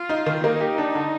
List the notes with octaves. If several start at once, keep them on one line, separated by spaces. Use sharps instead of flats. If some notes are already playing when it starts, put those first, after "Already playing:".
Already playing: F4
D#4
D#3
A#3 D#4
G4
D4
D3